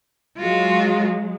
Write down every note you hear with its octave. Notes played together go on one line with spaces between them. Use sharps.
F#3 G#3 F4 F#4